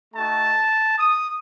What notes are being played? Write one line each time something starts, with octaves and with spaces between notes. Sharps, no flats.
A3 D#4 F#4 A5
D#6